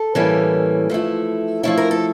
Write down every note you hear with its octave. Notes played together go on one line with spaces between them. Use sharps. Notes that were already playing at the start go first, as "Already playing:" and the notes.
Already playing: A4
A2 E3 G3 A#3 C#4
F3 A3 E4
F3 A3 E4 C#5
A#4
A4